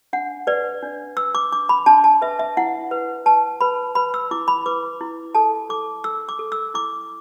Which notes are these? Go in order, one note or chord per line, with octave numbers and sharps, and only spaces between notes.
D4 F#5
B4 D5
D4
B4 E6
D6
D4 D6
B5
D4 A5
A5
B4 E5
E5
E4 F#5
B4
B4 A5
B4 B5
B4 B5
E6
E4 D6
B5
B4 D6
E4
A4 A5
A4 D6
A4 E6
D6
A4
E6
E4 D6